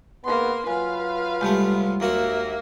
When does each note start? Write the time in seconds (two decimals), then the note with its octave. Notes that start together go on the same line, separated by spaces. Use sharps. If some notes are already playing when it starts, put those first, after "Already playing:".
0.25 G#2 A#3 B3 C6
0.67 F#3 F4 B4 F5 G#5
1.41 C2 G#3 A3 G4 A5
2.00 D#2 A#3 F#4 E5